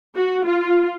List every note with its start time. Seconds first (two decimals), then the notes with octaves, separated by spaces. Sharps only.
0.15 F#4
0.44 F4